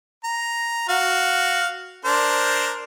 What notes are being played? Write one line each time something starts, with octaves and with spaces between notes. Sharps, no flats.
A#5
F#4 F5
D4 A#4 C5